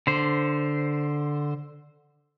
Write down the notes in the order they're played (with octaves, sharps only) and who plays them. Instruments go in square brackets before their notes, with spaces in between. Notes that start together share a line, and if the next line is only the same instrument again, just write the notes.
[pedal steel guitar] D3 C5